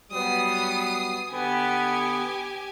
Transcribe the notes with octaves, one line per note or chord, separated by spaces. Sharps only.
F#3 G3 B3 D#6 C7
D3 B3 G4 G#5